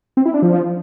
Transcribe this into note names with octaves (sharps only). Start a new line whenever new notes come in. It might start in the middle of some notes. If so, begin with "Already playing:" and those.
C4
E4
D4
F3